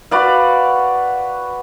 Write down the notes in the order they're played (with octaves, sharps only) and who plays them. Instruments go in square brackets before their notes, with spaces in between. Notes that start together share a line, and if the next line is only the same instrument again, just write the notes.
[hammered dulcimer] F#4 B4 D5 F5